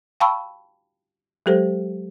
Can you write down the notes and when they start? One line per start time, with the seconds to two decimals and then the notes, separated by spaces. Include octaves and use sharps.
0.20 F5 G5 A5 B5 C#6 E6
1.46 F#3 G#3 G4 A4 C5